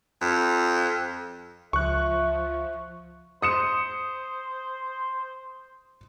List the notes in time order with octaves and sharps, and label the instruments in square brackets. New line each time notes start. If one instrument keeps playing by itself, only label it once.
[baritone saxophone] F2
[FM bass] C#2 [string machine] F3 [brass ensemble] E5 [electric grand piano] C#6 F#6
[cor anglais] C5 [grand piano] D#6 C#7 E7